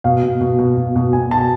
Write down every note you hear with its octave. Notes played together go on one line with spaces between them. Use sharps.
B2 F5
B2
B2
B2
B2
B2
B2 G#5
B2 A5